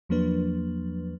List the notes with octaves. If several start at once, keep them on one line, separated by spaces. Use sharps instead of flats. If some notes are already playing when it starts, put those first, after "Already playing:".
E2 F3 F#3 A#3 D4 B4